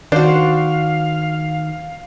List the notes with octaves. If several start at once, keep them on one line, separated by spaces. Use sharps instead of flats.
D#3 D4 F#4 C5 F5